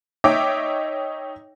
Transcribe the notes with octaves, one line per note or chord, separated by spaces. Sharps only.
D#4 C#5 D#5 E5 G5 D6